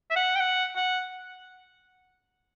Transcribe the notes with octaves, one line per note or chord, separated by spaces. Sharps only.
E5
F#5
G5
F#5
F#5